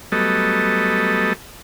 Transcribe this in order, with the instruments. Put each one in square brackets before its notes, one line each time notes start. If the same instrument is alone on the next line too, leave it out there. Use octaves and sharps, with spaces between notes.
[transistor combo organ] F#3 G3 A3 B3 A4 D#5